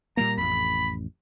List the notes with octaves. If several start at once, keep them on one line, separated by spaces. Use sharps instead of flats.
A#2 G3 A#3 A#5
A1 F2 B5